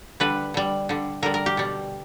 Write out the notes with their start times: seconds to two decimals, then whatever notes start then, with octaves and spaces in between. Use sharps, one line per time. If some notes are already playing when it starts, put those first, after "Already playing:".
0.20 D3 G3 B4
0.54 D3 G3
0.89 D3 G3
1.22 D3 G3 A#4
1.34 A#4
1.46 G4
1.57 B2 G3